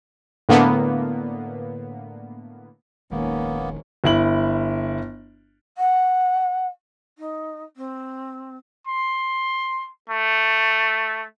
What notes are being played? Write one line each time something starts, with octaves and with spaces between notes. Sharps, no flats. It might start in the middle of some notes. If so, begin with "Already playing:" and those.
A2 D3 A#3 B3
F1 A#1 D#2 D#3 G#3 A#3 B3 C#4
G1 E4 F#7
F#5
D#4
C4
C6
A3